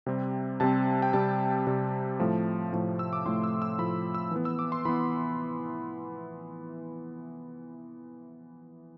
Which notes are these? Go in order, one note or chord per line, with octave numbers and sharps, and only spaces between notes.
C3 G3 C4
C3 G3 C4 A5
G5
C3 G3 C4 A5
C3 G3 C4
A2 F3 A3
A2 F3 A3
E6
D6
A2 F3 A3 C6
E6
E6
A2 F3 A3 B5
E6
E3 B3
E6
D6
C6
E3 B3 B5